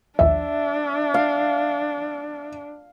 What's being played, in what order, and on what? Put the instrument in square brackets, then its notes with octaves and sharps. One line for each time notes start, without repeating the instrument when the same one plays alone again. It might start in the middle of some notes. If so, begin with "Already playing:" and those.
[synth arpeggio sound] A#1 D#2 F3 [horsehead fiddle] D4 [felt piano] E5
[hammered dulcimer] F5